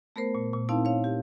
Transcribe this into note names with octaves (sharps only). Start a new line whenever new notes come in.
A3 B3 A#4 C5
A#2
A#2
C4 D#4 E4 F5 A5
C#5 F5
G4